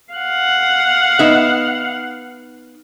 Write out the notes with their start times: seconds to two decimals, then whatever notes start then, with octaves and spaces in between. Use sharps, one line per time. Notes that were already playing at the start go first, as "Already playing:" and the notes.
0.14 F5 F#5
1.19 B3 D#4 E5